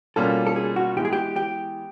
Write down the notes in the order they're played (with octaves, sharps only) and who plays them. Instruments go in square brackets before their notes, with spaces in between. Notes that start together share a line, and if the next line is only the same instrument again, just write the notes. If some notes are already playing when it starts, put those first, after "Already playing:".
[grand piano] B2 G3 A#3 C#4 F4 [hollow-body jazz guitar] A4
[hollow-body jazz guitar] A4
G#4
F#4
[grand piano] E3 G#3 B3 [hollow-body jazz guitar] G4
[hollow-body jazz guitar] G#4
G4
G4